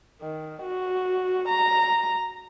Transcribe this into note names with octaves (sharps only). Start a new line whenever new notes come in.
D#3
F#4
A#5